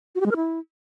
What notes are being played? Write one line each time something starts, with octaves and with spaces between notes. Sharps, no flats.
F#4
G4
G#3
A#4
E4